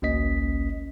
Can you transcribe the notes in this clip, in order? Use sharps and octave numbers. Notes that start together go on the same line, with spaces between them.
G#1 C#2 A#3 C#4 D#5 B6